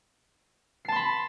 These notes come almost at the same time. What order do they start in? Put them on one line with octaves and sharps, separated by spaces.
C7 A5 C6 B5